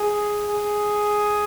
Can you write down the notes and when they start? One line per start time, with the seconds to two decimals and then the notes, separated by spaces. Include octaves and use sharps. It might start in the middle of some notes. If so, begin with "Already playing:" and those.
Already playing: G#4
0.49 G#4